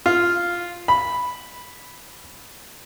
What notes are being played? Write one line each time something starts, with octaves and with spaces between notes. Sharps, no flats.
F4
B5